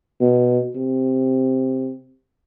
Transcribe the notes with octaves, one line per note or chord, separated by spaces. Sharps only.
B2
C3